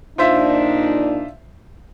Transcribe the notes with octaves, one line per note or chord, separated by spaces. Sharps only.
A#2 D4 D#4 F4 C5 E5